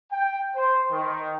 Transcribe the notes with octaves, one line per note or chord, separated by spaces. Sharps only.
G5
C5
D#3